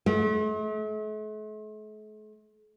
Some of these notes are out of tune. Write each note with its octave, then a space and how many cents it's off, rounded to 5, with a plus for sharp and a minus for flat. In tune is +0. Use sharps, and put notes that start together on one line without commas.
A3 -45